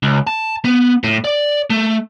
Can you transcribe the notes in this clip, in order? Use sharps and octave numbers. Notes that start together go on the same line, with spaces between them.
C#2
A5
B3
A2
D5
A3